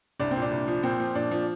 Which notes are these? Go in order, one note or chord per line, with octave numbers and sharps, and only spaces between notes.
C2 D4
A#2 C4
D4
C2
F3
A#2 C4
F3
A#2 D4
F3